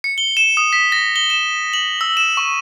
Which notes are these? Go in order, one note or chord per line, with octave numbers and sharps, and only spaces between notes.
C#7
G7
E7
D#6
B6
A#6
G7
E7
F#7
E6
E7
C#6